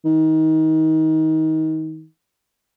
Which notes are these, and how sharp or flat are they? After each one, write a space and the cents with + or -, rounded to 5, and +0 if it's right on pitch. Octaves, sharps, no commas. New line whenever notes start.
D#3 +25